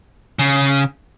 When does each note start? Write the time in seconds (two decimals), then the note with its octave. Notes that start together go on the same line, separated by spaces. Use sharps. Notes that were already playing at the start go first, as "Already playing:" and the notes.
0.39 C#3